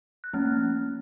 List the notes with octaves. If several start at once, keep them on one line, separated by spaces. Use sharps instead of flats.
F#6
F3 A#3 C#4 F6
F#6